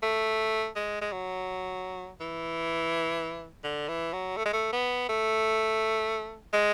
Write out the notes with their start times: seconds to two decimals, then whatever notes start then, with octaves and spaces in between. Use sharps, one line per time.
0.03 A3
0.76 G#3
1.01 G#3
1.12 F#3
2.20 E3
3.64 D3
3.88 E3
4.13 F#3
4.37 A3
4.45 G#3
4.53 A3
4.73 B3
5.09 A3
6.53 G#3